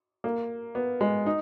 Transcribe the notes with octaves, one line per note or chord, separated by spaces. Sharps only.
A#3
B3
G#3
D#4